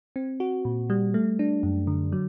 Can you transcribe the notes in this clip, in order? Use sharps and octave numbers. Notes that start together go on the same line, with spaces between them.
C4
F#4
A#2
G3
A3
D4
F#2
D3
F#3